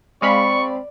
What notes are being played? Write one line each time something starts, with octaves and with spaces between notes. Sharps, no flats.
G#3 C4 D5 F5 B5 C#6